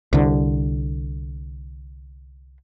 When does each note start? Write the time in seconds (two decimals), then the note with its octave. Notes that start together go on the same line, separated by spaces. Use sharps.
0.13 C2 D3